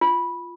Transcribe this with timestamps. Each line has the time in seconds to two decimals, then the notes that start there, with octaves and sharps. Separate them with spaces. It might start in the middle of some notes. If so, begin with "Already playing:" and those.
0.01 F4